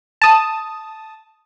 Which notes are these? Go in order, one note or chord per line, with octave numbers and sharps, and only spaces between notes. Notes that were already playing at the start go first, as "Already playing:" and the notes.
A5 D#6